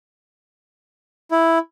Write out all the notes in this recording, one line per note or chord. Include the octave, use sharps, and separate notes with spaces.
E4